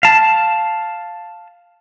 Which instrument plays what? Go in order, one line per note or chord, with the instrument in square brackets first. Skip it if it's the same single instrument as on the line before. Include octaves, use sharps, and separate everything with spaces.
[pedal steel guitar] F5 A5